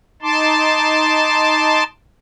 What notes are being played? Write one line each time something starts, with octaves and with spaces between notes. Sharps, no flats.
D#4 A5 C6 D6